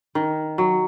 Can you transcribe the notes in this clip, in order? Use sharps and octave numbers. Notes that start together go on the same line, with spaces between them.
D#3
F#3